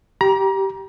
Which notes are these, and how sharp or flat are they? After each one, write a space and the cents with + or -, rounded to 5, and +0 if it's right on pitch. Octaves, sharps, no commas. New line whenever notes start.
G4 -15 A#5 +30